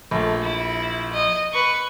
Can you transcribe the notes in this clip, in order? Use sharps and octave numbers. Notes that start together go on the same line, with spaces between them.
A#1 A3
E4
D#5
B4 C#6